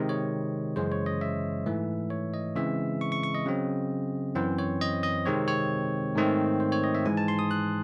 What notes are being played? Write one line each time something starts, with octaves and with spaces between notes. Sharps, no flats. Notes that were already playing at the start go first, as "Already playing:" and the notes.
Already playing: C3 D#3 G#3 C4 D#5
C#5
F#2 C#3 E3 G#3 C5
C#5
D#5
E5
G#2 E3 A3
C#5
D#5
C#3 E3 G#3 C4 E5
C#6
C#6
C#6
D#5
C#3 F#3 C4
F#2 E3 C4 C5
C#5
D#5
D#5
C3 D#3 G#3 C4 C#5
C#5
G#2 D#3 A3 C4
C5
C#5
D#5
E5
G#2 E3 G#3 G#5
A5
C6
D#6
F#6